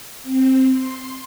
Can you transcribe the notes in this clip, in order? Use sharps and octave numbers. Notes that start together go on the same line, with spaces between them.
C4
C6